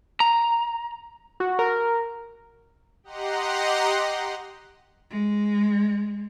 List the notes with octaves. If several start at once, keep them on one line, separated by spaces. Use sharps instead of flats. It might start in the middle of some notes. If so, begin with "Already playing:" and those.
A#5
F#4
A#4
G4 D#5 F#5 A#5 C6
G#3